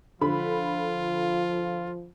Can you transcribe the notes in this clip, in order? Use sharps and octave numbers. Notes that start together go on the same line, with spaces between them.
D3 F3 F4 B5